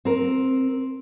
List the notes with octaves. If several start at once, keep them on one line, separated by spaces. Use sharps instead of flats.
C4 A#4